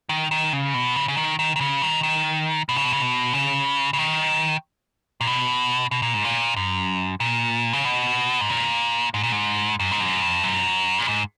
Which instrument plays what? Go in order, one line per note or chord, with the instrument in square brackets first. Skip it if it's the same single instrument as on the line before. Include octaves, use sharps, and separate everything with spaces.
[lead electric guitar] D#3
D#3
C#3
B2
C#3
C#3
D#3
D#3
D#3
C#3
D#3
D#3
B2
C#3
B2
C#3
B2
C#3
C#3
D#3
A#2
B2
B2
A#2
G#2
A#2
F#2
A#2
C#3
B2
G#2
A#2
G#2
A#2
G#2
F#2
G#2
F#2
F2
F#2
A#2
G#2